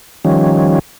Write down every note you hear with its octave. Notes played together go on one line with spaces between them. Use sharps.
D#3 F3 G3 C#4